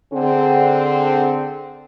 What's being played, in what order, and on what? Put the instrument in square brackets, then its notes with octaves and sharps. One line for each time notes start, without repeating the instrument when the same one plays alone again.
[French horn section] D3 C4 G#4